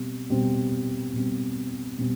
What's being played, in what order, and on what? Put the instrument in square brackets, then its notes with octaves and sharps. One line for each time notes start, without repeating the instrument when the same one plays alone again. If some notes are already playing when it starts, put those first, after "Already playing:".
Already playing: [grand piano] B2 G3 C4
B2 G3 C4
B2 G3 C4
B2 G3 C4